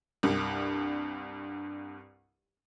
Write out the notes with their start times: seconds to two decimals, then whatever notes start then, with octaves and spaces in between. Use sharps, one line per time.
0.23 C2 G2